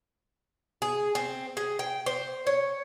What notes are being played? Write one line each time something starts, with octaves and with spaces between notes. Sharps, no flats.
G#4
C4
G#4
G5
C5
C#5